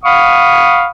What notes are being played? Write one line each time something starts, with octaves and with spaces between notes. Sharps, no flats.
F5 F#5 B5 C#6 D#6